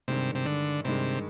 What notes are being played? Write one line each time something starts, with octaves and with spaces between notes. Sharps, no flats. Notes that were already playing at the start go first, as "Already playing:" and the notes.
G2 C3 D#3 G#3
C3
D3
G2 C3 D#3 G#3